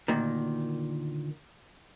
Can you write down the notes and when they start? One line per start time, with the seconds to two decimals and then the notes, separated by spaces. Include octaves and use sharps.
0.08 D2 A#2 D#3